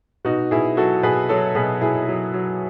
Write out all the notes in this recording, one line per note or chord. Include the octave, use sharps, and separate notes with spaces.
B2 D#4 F#4
B2 E4 G#4
F#3 F#4 A4
B2 G#4 B4
F#3 A4 C#5
B2 G#4 B4
B2 E4 G#4
F#3
F#3